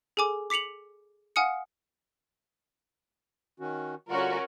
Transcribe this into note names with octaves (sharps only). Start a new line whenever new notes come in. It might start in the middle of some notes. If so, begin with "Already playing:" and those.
G#4 A4 G#5 D6
D6 B6 C#7 F7 F#7
F5 F#5 G#5 D#6 F6 C#7
D#3 C#4 F#4
D3 G3 C#4 F4 F#4 A#4